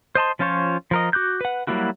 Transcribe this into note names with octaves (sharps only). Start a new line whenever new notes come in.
C5 D#5 A5 C6
F3 C#4 F4 C5 C#5
F3 A#4 D#5
F#4 D6 F#6 G6
B4 F#5
F#3 G3 A#3 E4 F#4